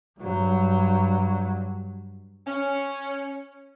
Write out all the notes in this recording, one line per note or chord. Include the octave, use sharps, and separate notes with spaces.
G2 F#3
C#4